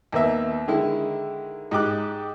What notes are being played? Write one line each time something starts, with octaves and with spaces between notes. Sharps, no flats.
D#2 A#3 B3 E5
D3 D#3 G#3 E4
G#2 G4 D6 F#6